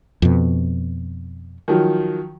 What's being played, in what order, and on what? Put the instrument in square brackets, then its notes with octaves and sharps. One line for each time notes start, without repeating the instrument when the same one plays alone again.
[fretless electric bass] F2 B2
[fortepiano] D#3 F3 F#3